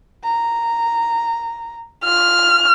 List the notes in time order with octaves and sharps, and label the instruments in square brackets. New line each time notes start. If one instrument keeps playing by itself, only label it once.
[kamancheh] A#5
[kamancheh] F4 [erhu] F6